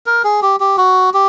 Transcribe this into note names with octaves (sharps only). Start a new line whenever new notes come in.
A#4
G#4
G4
G4
F#4
G4